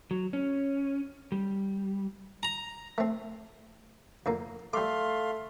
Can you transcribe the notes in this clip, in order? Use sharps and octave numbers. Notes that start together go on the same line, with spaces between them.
F#3
C#4
G3
A#5
A3 C4
F2 D3 A#3
G3 A3 F5 C6 D6